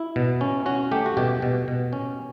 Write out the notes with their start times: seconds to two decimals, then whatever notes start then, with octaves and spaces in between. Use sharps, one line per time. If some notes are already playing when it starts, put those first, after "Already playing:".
Already playing: E4
0.16 B2
0.41 C#4
0.66 C#4 F#4
0.91 A3 G4
1.06 F#4
1.17 B2 G4
1.42 B2
1.68 B2
1.93 C#4